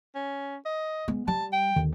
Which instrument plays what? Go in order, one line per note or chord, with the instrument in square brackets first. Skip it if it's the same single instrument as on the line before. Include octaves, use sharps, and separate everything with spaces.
[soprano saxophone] C#4
D#5
[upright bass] G#3 B3
[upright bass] G3 [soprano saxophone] A5
[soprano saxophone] G5
[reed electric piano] D#2 [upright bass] D3